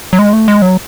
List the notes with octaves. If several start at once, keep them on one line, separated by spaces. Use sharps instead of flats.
F#3
G#3
A3
G#3
F#3